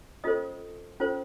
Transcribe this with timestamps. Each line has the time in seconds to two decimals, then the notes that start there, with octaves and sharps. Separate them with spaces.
0.24 C#4 F4 A4 C5 D#5 D#6
1.00 C#4 F4 A4 C5